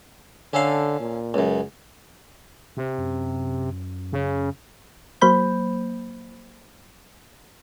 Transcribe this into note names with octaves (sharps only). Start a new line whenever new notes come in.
D3 C#4 A4 F5
A#2
C#2 F#2
C3
F#2
C#3
F#3 A#3 C5 B5 G6